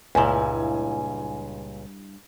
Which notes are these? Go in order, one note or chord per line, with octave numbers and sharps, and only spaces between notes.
C#2 G2 A#2 E4 G#5